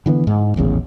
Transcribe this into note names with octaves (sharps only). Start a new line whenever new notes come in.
D3 E3 A#3 B3
G#2
D#1 A1 E2 C#3